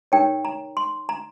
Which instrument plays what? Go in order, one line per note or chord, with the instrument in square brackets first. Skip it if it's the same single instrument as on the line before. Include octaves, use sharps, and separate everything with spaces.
[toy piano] D#4 G4 A#4 C#5 G5
A#5
C6
A#5